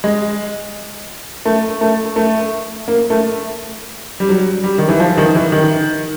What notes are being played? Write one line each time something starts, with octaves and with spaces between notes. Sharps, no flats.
G#3
A3
A3
A3
A#3
A3
G3
F#3
G3
D#3
E3
F3
D#3
E3
D#3